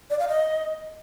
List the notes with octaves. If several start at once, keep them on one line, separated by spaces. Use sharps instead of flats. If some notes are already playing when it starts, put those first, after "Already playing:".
D5
F5
D#5